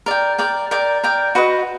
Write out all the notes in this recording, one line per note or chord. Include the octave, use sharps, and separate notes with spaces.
A#4 D5 G5
A#4 D5 G5
A#4 D5 G5
A#4 D5 G5
F#4 B4 D#5